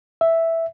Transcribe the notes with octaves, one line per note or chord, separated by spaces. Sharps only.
E5